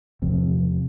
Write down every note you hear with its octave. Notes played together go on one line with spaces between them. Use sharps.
E2 C3 F3 C4